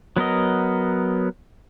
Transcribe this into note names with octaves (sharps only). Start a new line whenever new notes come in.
F#3 B3 A#4 D#5